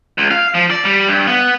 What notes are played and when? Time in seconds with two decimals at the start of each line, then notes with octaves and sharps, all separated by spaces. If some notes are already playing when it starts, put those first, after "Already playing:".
0.18 C#2
0.31 F5
0.55 F3
0.70 D5
0.85 G3
1.08 G2
1.27 B3